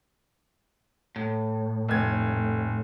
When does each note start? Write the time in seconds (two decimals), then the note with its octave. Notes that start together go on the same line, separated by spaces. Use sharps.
1.16 A2
1.89 F1 G#6